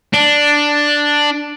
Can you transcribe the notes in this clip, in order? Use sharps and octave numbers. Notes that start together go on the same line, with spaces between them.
D4